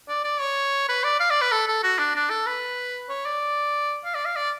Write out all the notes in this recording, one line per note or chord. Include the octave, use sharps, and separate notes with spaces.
D5
D5
C#5
B4
D5
F5
D5
B4
A4
A4
F#4
D4
D4
A4
B4
C#5
D5
F5
D5
F5
D5